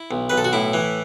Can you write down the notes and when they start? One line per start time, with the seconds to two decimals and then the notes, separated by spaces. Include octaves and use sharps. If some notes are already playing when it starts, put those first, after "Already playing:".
Already playing: E4
0.11 B1
0.30 B1 B4
0.37 A4
0.45 F#4
0.53 A2 E4
0.74 E3